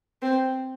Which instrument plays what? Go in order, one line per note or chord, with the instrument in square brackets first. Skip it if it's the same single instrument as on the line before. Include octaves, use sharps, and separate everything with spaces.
[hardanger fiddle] C4